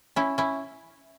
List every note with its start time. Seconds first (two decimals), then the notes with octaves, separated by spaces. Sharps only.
0.16 C#4 E4
0.38 C#4 E4